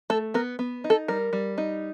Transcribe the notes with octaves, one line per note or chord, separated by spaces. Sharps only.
A3 A4
B3 A#4
B3
D#4
A4
G3 A#4
G3
D#4